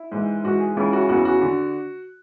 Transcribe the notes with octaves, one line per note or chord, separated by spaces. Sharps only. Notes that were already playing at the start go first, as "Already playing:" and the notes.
Already playing: E4
G#2 E3
G#2 E3 F#4
G#4
C#2 C#3 E3 E4
F#4
E2 C#3 E3 F#4
F#4
D3